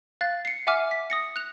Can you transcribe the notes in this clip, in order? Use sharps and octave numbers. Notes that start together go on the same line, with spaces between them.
F5 F#6 A6
C7 C#7
E5 F#5 G#5 D6 F6
B6
D#6 A#6 C#7
F#6 F7